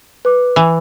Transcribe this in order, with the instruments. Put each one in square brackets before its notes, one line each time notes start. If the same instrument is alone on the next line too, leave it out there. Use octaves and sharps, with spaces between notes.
[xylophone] B4 D6
[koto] E3